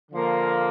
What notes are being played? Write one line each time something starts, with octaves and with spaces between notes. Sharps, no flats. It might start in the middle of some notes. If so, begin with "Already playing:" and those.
D3 F3 A#3